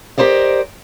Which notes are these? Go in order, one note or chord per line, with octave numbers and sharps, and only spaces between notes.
G4 A#4 C5 D5 D#5